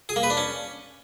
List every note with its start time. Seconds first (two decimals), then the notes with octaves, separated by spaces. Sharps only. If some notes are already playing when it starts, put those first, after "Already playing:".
0.09 G#4
0.16 A#3
0.23 B4
0.30 D4
0.37 C#4